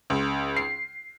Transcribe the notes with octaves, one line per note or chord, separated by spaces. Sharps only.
C#2
C7